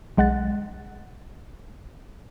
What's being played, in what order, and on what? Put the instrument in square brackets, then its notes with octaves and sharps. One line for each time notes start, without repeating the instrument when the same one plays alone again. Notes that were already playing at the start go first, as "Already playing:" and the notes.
[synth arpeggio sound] B1 G#3 F#5 F#6 A6